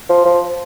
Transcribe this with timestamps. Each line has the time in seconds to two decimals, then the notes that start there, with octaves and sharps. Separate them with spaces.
0.09 F3
0.25 F3